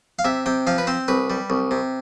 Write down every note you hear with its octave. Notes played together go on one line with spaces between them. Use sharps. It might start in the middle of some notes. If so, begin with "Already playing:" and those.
F5
C3 E5
C3 G5
F3 F5
B4
C4 C5
C2 B4
G3
C2
C3